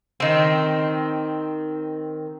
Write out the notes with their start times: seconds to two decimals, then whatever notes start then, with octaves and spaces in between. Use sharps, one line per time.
0.20 D#3 C4